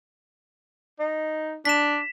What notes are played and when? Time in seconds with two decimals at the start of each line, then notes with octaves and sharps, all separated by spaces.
1.00 D#4
1.65 D4 B6 E7